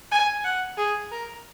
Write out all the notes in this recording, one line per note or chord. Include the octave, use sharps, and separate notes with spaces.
G#5
F#5
G#4
A#4